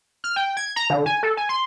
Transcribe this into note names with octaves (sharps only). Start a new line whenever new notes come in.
F6
G5
G#6
A#5
D3
G#5
A4
G#5
C6